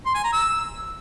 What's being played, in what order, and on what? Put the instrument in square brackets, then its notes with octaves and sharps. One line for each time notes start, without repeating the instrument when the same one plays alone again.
[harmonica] C6
G#5
A#5
E6